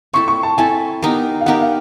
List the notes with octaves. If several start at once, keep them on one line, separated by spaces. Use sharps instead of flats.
C4 E4 A4 C#6
C#6
A5
C4 E4 A4 G#5
B3 D#4 G4 A#4
F5
B3 D#4 G4 A#4 F#5
F5